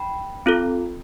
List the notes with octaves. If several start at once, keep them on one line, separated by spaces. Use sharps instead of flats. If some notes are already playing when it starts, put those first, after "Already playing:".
Already playing: G5 B5
C4 F4 A4